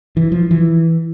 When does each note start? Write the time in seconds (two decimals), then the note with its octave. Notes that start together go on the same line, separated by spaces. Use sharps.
0.17 E3
0.32 F3
0.51 E3